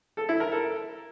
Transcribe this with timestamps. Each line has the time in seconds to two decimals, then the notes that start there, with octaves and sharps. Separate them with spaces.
0.17 A4
0.29 E4
0.40 A#4
0.52 A4